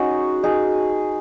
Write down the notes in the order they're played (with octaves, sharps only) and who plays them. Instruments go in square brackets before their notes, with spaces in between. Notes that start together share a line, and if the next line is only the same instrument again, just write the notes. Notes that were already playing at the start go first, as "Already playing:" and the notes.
Already playing: [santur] C#4 D#4 F#4 G#4
D#4 G#4